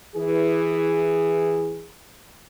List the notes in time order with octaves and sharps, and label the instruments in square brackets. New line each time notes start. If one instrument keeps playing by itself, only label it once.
[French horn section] E3 G#4